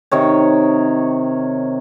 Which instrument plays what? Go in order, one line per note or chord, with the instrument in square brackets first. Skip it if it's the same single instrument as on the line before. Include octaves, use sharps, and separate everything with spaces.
[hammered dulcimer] C3 D#3 C#5